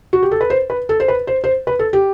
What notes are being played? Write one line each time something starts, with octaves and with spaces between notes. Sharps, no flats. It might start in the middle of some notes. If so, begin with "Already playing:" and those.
F#4
G4
A4
B4
C5
B4
A4
C5
B4
C5
C5
B4
A4
G4